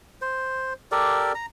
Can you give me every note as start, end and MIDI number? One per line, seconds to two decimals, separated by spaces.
0.22 0.73 72
0.92 1.32 67
0.92 1.32 69
0.92 1.32 70
0.92 1.32 74
1.35 1.46 82